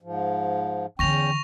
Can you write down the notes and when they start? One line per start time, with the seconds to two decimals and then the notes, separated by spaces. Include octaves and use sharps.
0.02 G#2 F3
0.99 E2 D3 E3 C#4 G5 C#6 A#6 F7